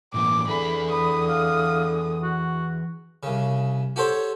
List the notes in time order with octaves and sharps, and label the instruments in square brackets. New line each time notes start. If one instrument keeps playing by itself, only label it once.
[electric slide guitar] A2 E3 A#3 [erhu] D6
[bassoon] D3 [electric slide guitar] E3 G#4 [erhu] B5
[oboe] B5 [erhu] D#6
[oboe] F5
F#4
[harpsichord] C2 C#3
F#4 G4 A4 C5 C#5